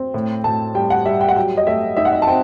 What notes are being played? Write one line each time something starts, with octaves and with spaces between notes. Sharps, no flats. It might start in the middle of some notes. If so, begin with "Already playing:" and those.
Already playing: C4
A2
A2 A5
G3 G5
F#5
G3 E5
G5
F#5
F#3 G5
D#5
A3 E5
D#4 E5
F#5
E5
A5
C4 G5